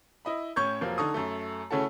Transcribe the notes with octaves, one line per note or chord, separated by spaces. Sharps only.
E4 D#5 B5
A2 C#4 C#5 C#6 G6 G#6
F1 F3 F#3 A#3
D3 D#4 A4 C#6 D#6
F#2 A3
C#3 A3 C#4 E4 F#4 A4